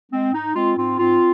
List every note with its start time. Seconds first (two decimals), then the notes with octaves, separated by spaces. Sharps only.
0.11 G#3 C4
0.33 G#2 D#4
0.54 G#3 C4 F4
0.77 G#2 C4 F4
0.98 G#2 C4 F4